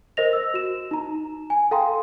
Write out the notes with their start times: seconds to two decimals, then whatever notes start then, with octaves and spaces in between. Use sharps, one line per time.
0.17 A#4 C5 D#5 A#6 F7
0.33 E6
0.54 F#4 E7
0.91 D#4 A#5
1.50 G#5
1.71 A4 F5 G5 A#5 C6